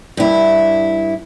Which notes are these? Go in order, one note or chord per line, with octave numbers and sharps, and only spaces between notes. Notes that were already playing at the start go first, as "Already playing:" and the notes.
G2 E4